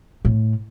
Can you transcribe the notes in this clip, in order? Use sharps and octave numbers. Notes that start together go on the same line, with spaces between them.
A2